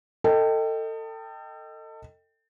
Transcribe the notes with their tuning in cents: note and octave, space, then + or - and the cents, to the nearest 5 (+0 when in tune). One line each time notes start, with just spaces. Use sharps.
A4 +30 D#5 +0 G5 +0